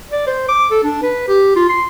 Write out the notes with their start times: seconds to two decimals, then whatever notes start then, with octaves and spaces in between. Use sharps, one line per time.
0.11 D5
0.27 C5
0.49 D6
0.71 A4
0.83 D4
1.02 B4
1.28 G4
1.56 F4
1.69 C6